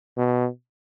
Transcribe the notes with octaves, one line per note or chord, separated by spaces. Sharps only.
B2